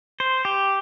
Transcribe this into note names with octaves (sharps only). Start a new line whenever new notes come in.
C5
G4